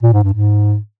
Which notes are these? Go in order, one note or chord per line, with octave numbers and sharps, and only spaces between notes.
A#2
G#2
G2
G#2